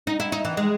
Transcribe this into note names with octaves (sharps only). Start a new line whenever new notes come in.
D#4
E4
D#4
E3
G#3